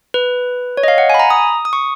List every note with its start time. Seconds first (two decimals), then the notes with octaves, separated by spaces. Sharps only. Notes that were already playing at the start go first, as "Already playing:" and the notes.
0.14 B4
0.77 C#5
0.83 D#5
0.88 F5
0.98 F#5
1.10 G#5 B5
1.19 A#5
1.30 D#6
1.65 D#6
1.73 C#6